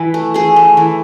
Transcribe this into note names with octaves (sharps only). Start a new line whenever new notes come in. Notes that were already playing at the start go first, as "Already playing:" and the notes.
Already playing: E3 E4 B4
A3
A3 G#4
A3
E3